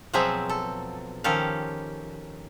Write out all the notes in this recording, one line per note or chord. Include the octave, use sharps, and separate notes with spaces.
B2 F3 F#3 C4 G#4 E5
A4
D#3 F3 C#4 G4 A4 F5